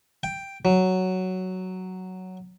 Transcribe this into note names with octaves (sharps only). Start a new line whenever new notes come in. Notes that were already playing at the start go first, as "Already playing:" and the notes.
G5
F#3